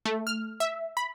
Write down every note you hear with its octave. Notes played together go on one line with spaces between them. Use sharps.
A3
F6
E5
B5